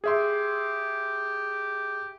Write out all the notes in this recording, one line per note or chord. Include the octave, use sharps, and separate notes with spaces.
G4 G#4 E5 C6